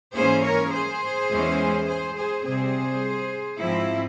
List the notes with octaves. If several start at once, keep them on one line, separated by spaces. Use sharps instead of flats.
G#2 E3 A#3 C#4 G#4 C5
A#4 C#5
G#4 C5
E2 E3 G#3 C#4
G#4 C5
G#4 C5
C3 G3 C4 G#4 C5
G#2 F3 C4 E4